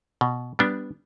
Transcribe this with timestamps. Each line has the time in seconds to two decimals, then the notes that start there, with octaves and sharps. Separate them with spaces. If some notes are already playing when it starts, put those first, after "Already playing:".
0.21 B2
0.59 G3 B3 D4